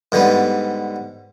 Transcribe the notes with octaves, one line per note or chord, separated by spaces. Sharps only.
G#2 D3 G3 B3